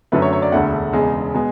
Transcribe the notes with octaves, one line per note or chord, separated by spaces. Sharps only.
F#2 D3 F#3 A3 B4
C#5
C#5
D5
E1 D2 D3 A3 F#5
E1 E2 C#3 G#3
B2 G#3